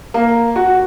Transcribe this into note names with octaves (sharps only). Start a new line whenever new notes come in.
A#3
F#4